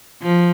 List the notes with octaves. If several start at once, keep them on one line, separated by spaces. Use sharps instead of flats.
F3